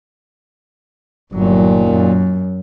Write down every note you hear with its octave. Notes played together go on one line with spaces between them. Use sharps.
G1 D#2 A#2 F#3
F#2